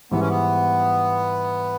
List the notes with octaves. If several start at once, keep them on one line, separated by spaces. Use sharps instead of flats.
G#2 E3 G3 B3
C#4
B3